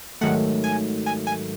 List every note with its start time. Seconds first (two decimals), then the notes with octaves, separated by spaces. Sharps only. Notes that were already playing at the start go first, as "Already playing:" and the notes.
0.21 G#2 D#3 F#3 A3 F#5
0.64 G#5
1.06 G#5
1.27 G#5